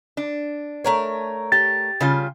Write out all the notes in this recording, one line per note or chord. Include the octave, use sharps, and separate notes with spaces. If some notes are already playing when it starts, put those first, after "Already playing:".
D4
A3 A#4 C#5
G4 A6
C#3 G3 F4